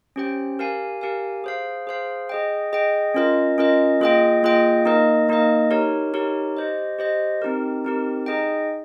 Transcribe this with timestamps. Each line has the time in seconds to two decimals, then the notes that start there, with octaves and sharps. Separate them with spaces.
0.16 C#4 G4 C5 G5
0.59 G4 A#4 F5 G#5
1.01 G4 A#4 F5 G#5
1.44 G#4 C5 F5
1.87 G#4 C5 F5
2.29 G#4 D#5 G5
2.73 G#4 D#5 G5
3.15 C#4 F4 A#4 D#5
3.58 C#4 F4 A#4 D#5
4.01 A#3 F4 G#4 D#5 G5
4.43 A#3 F4 G#4 D#5 G5
4.85 A#3 D#4 A#4 D#5
5.29 A#3 D#4 A#4 D#5
5.71 D#4 G4 A#4 C#5
6.14 D#4 G4 A#4 C#5
6.57 G4 C5 D#5
6.99 G4 C5 D#5
7.42 C4 D#4 G4 A#4
7.85 C4 D#4 G4 A#4
8.26 D#4 G#4 D#5 G5